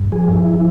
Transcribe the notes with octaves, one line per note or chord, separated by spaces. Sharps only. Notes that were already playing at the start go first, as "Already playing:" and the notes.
Already playing: G2
F3 G#4
E4
F3